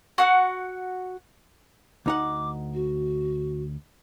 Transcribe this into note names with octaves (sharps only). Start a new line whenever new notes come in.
F#4 F#5 F#6
D2 D#4 F#5 D6
F#4